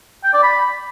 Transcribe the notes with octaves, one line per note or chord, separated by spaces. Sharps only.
G5
D5
B5